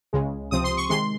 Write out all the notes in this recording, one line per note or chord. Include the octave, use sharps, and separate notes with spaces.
C#2 C#3 G#3
C#2 C3 F3 C4 D#6
C6
C#6
C3 D#3 G#3 C6